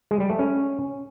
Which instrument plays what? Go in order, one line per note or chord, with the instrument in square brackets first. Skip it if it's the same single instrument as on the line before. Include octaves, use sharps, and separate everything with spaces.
[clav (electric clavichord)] G#3
G3
A3
C#4